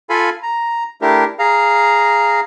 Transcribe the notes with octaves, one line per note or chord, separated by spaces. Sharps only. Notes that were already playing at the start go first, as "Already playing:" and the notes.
F4 A4 F5 G#5 B5
A#5
A3 D4 E4 G4 A#4
G#4 F5 A#5